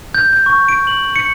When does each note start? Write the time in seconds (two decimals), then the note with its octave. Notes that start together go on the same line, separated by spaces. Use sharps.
0.15 G6
0.33 G6
0.46 C#6
0.68 D7
0.87 F#7
1.16 C#7